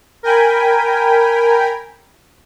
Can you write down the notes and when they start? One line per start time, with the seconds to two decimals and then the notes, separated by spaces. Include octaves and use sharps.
0.23 A#4 G5 G#5 B5